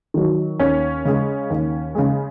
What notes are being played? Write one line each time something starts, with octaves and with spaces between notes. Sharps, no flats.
D#3 F#3
D#2 C#4
C#3 G#3
D#2
C#3 G#3